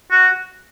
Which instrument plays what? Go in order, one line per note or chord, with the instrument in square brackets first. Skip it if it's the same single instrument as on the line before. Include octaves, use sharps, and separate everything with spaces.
[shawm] F#4